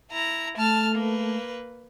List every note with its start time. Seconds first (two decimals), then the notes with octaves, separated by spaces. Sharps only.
0.11 E4 A#5
0.57 A3 A5 F6
0.95 A#3 B4